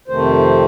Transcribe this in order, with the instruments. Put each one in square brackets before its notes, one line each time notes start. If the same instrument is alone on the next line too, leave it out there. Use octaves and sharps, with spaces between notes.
[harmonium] F2 C3 D#3 A3 C5